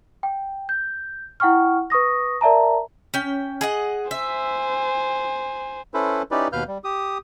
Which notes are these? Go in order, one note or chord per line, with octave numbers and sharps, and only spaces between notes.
G5
G6
E4 F#5 G5 C#6 F6
B4 C#6 D#6 A#6
A#4 D5 E5 A5 A#5
C#4 G5
G#4 D#5 F#5
C5 E5 G#5
C#4 E4 A4 B4 C5
C#4 D#4 E4 G4 B4 D5
D#2 B2 B4 F5 F6 G6
G3
G4 D#6